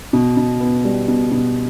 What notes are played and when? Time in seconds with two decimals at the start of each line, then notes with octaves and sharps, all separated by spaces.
0.13 B2
0.37 B2
0.60 B3
0.84 G3
1.08 B2
1.31 B2